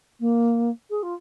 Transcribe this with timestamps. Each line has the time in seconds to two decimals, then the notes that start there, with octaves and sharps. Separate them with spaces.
0.20 A#3
0.90 G#4
1.03 F4